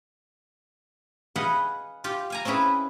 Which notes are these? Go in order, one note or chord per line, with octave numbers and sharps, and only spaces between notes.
G#4 B4 D#5 F5 F#5
F4 G4
F5 G#5 A#5
C4 C#4 E4 G#4 B4